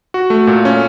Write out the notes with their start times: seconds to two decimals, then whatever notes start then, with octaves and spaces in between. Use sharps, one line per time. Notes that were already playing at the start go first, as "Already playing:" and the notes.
0.14 F#4
0.30 A3
0.47 A#2
0.65 C#4